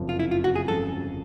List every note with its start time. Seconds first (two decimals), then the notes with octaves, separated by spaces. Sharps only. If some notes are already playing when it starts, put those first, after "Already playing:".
Already playing: F#1 F2 C3 F3
0.09 F4
0.19 E4
0.31 F4
0.44 F#4
0.55 G#4
0.68 G1 F2 C#3 F3 G#3 A4